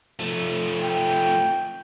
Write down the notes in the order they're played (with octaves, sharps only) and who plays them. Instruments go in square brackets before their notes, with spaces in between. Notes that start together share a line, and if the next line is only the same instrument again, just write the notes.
[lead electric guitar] F3 A3
[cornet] G5